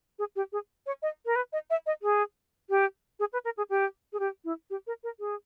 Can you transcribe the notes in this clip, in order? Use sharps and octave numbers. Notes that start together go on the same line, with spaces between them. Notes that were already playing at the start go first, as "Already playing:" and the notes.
G#4
G4
G#4
C#5
D#5
A#4
B4
D#5
E5
D#5
G#4
G4
G#4
B4
A#4
G#4
G4
G#4
G4
E4
G4
A#4
A#4
G#4